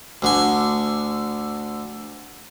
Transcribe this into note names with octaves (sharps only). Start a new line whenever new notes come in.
D2 D3 G#5